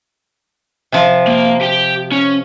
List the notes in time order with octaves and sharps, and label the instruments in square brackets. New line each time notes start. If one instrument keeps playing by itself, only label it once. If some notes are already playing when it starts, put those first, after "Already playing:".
[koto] C3 F3
[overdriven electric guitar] A#3
G4 G5
C#4